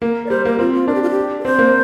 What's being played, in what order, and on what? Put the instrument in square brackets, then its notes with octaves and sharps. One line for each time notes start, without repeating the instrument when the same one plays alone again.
[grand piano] A#3 [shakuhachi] A#4
[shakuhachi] D5
[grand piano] G3 [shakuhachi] C5
[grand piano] A#3 [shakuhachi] A#4
[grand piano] C4 [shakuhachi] F4
[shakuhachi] F4
[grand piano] D4 [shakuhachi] A#4
[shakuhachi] G4
F4
G4
A#4
[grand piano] C4 [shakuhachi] C5
[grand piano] A#3